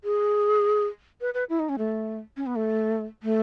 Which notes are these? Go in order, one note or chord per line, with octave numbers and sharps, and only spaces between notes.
G#4
B4
B4
E4
D#4
C#4
A3
C#4
B3
A3
A3